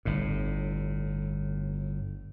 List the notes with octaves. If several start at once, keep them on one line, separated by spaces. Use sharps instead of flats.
G1 A2